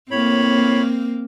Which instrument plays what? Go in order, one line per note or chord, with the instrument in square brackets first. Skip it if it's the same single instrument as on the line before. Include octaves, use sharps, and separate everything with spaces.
[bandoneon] A2 C#5 B5 [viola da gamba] A#3 C4